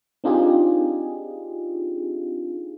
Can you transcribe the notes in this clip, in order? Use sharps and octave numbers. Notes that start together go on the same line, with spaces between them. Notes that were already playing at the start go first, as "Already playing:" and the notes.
C4 D4 D#4 F4 G4 G#4